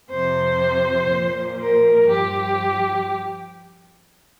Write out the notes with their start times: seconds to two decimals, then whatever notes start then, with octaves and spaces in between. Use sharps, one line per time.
0.11 F2 C3 F3 C5
1.10 A#2 F3
1.60 A#4
2.09 G2 F3 G4